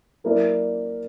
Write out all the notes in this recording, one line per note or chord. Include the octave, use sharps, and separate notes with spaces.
F#3 A#3 E4 A#4 D5